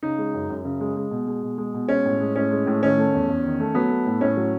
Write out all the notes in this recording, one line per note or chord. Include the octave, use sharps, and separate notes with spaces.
C#3 D#4
G#3
F#2
F#2
C#3
G#3
G#3
B2
G#3
B2
G#3
B2
G#3 C#4
A2
G#3
A2 C#4
G#3
A2
D#3 C#4
A3
E2
E2
D#3
A3
F#3 B3
A3
A2
A2 C#4
F#3